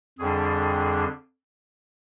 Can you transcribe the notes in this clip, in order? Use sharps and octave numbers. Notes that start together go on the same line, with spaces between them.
F2 D3 G3 D4 G#4